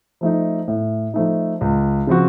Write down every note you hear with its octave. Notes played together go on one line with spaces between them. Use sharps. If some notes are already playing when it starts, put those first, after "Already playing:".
F3 A3 D#4
A2
F3 A3 D#4
C#2
C#3 F3 C4 F#4